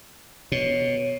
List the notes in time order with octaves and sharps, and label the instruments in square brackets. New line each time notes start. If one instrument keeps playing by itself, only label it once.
[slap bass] B2 [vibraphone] C#5